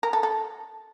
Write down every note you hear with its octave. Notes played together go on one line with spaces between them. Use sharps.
A#4
A4
A4